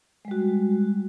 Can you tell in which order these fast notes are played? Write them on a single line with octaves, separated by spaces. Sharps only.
G#3 G3 F#4